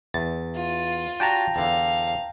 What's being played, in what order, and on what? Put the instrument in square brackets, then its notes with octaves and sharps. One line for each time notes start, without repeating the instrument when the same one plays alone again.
[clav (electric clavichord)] E2 [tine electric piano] A6
[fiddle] F4
[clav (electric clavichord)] D4 F#4 G4 [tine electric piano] G5 A5 A#5
[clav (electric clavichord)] E2 D3 [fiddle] F5